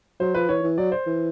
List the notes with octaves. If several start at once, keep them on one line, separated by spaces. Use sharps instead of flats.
F#3 C5
F3 B4
E3 C#5
E3
F#3 D5
C5
E3